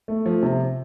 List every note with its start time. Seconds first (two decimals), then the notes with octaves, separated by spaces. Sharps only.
0.08 A3
0.26 F3
0.42 C3